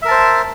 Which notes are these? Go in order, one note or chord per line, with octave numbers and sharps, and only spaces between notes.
A#4 C5 E5 A5